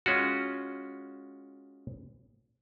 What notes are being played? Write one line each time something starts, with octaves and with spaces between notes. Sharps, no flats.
G#3 C#4 F4 F#4